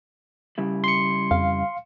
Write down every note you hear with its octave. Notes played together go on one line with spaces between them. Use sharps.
C#3 G3 E4
C6 C#7
F2 F5